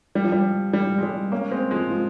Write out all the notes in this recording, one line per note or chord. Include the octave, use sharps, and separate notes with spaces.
G3
F3
G3
G3
G#3
G3
A#3 C#4
G#3 C4
F3 G#3
F3